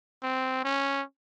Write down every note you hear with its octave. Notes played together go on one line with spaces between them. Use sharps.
C4
C#4